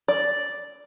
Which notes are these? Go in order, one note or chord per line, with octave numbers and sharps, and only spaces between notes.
D5